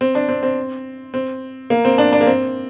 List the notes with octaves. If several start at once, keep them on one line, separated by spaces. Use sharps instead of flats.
C4
D4
C4
C4
C4
A#3
C4
D4
D4
A#3
C4